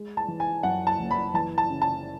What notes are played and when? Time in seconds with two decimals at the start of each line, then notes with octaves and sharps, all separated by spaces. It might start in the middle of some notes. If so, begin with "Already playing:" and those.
Already playing: G#3
0.17 A5
0.28 E3
0.40 G#5
0.63 F#2 F#5
0.87 A5
0.99 F#1
1.11 B5
1.34 E3 A5
1.58 A5
1.70 C#3
1.82 A5